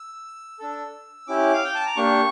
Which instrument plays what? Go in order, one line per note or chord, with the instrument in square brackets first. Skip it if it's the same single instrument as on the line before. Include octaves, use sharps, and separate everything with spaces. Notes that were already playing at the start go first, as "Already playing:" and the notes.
Already playing: [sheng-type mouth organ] E6
D4 A4
C#4 E4 G4 D6
F5
G5
A5
A#5
A#3 D4 G4 C#6